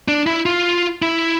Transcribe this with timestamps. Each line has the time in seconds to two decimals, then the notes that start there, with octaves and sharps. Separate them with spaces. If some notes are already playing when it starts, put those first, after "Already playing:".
0.08 D4
0.27 E4
0.46 F4
1.02 E4